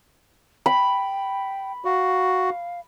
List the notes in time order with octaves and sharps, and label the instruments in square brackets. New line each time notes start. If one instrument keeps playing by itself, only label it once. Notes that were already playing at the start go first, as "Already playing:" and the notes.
[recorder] G5 [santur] B5
[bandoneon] F#4 [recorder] F5